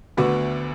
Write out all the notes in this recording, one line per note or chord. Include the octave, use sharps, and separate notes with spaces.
D2 D3 B3 F#4 B4